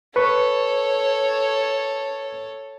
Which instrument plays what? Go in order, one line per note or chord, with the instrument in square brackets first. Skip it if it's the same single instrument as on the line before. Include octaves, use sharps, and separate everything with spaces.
[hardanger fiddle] A4 C#5 [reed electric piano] B4 C#6